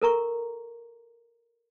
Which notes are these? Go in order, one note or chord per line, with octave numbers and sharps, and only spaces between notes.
A4 A#4 A#5 C#6